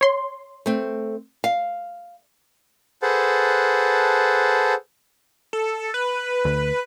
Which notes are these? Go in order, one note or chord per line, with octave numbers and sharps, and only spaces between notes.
C#5 C6
A3 C4
F5
G#4 A4 B4 C5 F#5 A5
A4
B4
D2